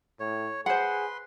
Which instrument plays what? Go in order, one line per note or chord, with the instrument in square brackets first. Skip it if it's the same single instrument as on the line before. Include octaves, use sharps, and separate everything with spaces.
[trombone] A2 [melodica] C#5
[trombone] G#4 [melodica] B4 C6 [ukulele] C5 F#5